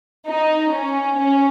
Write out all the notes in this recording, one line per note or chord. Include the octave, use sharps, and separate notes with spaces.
D#4
C#4
C#4